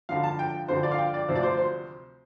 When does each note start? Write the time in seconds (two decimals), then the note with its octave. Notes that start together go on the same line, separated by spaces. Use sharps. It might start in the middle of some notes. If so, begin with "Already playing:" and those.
0.09 F2 D3 F3 F5
0.23 A5
0.39 G5
0.68 F2 D3 F3 C5
0.83 D5
0.91 F5
0.98 G5
1.14 D5
1.28 D2 C3 F3 C5
1.35 D5
1.43 C5
1.57 C5